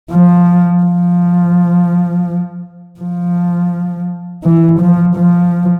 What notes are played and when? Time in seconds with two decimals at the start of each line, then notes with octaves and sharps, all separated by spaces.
0.11 F3
0.83 F3
3.00 F3
4.44 E3
4.80 F3
5.16 F3